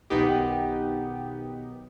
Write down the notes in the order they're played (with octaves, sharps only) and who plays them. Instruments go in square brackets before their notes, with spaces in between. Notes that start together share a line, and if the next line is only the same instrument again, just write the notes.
[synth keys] B1 D#3 B3 D#4 G4